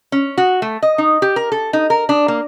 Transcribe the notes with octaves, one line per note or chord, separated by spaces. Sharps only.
C#4
F#4
A3
D#5
D#4
G4
A#4
A4
D#4
A#4
D4
A#3